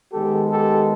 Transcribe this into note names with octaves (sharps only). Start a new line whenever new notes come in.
D#3 G#3 B3 G4 A4
G4 A4